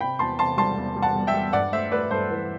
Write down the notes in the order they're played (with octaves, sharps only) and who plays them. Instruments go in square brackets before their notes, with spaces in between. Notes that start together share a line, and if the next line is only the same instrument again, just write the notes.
[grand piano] C3 G5 B5
E2 A5 C6
C3 A5 C6
G3 A5 C6
E2
G3
F#5 A5
G3
E5 G5
G3
G2 D5 F#5
A3 C5 E5
A3 B4 D5
G2 A4 C5
E3 B4